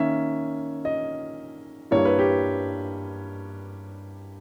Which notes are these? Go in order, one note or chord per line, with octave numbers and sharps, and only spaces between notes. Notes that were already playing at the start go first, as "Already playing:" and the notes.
Already playing: D#3 A#3 C#4 E5
D#5
G2 G3 A#3 E4 C#5
B4
G4